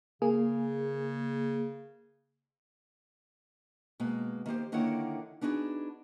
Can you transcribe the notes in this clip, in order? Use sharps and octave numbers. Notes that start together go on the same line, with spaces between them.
C#3 A#3 G#4
B2 G#3 A#3
D#3 A#3 G4 C5
D3 D#3 A#3 E4 C#5 F#5
B3 D4 D#4 F#4 G#4